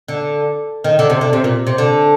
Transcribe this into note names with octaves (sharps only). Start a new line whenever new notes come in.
D3
D#3
D3
C3
D3
C3
A#2
C3
D3